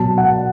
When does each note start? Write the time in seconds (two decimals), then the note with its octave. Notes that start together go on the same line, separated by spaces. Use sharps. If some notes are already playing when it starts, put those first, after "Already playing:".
Already playing: B2 F#3 A5
0.18 F#5